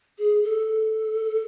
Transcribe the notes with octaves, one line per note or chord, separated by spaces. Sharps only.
G#4
A4